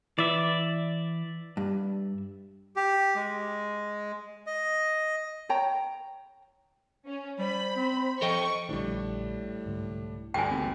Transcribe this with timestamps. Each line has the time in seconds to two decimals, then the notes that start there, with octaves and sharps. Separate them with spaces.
0.19 E3 D5 E5
1.57 G2
2.76 G4
3.15 G#3
4.46 D#5
5.49 C#5 G5 A#5
7.07 C#4
7.39 G3 C5 B5
7.76 C4
8.22 F3 A4 D#5 G5 C#6
8.69 A#1 A2 D3 F3 G3 D4
9.66 C2 G#2 D3
10.34 D2 G2 D3 G5 G#5
10.51 G#1 E3 G3 A#3